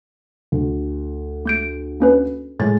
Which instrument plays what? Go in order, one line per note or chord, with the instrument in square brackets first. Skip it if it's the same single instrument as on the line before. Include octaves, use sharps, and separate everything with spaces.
[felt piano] D2
[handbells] A3 G6 D7
A#3 C#4 B4
[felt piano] A2 G#3 A6